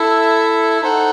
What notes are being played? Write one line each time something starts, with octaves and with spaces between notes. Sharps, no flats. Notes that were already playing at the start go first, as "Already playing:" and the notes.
Already playing: E4 A4 E5
D#4 A4 C5 F#5